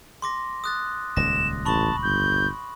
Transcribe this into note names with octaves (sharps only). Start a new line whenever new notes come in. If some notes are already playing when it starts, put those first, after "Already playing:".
C6 D6 A#6
D#6 F#6 A6
D#1 C#2 A#6 E7
A1 A5 B5 C#6 F#7
G1 G6